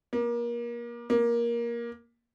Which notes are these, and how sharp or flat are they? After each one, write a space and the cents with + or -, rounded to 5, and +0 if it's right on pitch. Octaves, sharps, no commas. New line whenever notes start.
A#3 +30
A#3 +15